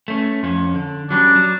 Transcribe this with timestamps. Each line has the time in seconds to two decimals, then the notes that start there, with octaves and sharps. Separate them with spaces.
0.08 A3 C#4
0.43 F2 C#4
0.74 D3
1.11 F#3 G3 C#4 D4
1.35 F#3